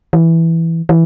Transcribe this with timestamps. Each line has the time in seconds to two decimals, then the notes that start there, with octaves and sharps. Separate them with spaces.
0.13 E3
0.89 E3